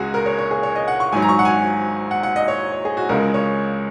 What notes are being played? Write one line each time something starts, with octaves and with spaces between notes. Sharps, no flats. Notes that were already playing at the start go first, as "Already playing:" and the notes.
Already playing: C#2 C#3 G#3 F#4 G#4
A#4
C#5
C#5
G#4
C#5
D#5
F#5
C#6
G#1 G#2 F#3 G#5
A#5
C#6
F#5
G#5
F#5
F#5
D#5
C#5
C#5
G#4
F#4
C#2 C#3 G#3 A#4
C#5